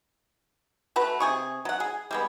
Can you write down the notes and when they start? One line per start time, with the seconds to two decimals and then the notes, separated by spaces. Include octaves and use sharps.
0.96 A3 F#4 B4
1.20 C3 G#4 C#6
1.65 F#3 F#5
1.80 G#4
2.11 G3 G#3 B3